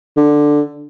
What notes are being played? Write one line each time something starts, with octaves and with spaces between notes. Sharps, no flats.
D3